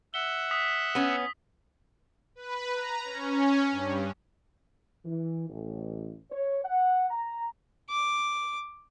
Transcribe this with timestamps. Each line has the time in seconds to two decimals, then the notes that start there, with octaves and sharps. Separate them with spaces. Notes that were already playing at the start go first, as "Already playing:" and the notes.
0.14 E5 F#5 G7
0.51 D#6 B6
0.95 B3 C#4
2.35 B4
2.74 A#5
3.05 C#4
3.71 G2
5.05 E3
5.48 A1
6.31 C#5
6.64 F#5
7.10 A#5
7.90 D6